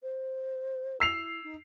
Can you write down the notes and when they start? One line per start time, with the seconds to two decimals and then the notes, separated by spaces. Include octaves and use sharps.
0.02 C5
1.00 E4 E6 C7 F7
1.44 D#4